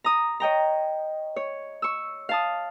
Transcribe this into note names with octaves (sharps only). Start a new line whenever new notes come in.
A#5 D#6
C#5 D#5 G5 A#5
C#5
C#6 E6
F5 A5 D#6